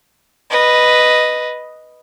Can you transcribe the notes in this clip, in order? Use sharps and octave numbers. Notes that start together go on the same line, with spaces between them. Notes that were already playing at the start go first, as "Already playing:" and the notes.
B4 D#5